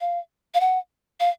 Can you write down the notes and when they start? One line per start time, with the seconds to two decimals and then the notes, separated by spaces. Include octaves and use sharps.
0.01 F5
0.54 F5
0.61 F#5
1.20 F5